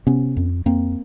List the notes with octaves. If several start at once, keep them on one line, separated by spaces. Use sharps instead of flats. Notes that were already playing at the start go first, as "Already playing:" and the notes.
C3 B3 C#4
F2
F2 A#3 C4